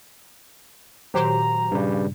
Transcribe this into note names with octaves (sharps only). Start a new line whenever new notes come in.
A#2 D#3 F#3 G4 C5 A#5
G2 C#3 G3